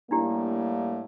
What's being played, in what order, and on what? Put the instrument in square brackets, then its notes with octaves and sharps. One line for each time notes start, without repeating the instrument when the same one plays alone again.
[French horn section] A2 G3 A#3 [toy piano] D4 E4 G4